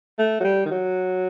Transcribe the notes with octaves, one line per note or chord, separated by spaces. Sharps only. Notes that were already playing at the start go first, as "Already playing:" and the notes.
A3
F#3
G3
D#3
F#3